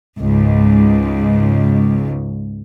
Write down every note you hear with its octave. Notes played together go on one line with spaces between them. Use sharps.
C#2 G#2